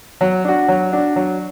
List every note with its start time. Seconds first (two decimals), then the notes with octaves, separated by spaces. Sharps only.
0.21 F#3
0.45 D4 F#4
0.68 F#3
0.92 D4 F#4
1.16 F#3